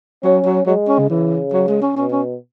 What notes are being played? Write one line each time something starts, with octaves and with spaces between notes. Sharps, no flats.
F#3 C#4
F#3
F#3 G#3
C#4
C#3
C#3 E3
F#3
G#3
C#4
B2 C#4
C#4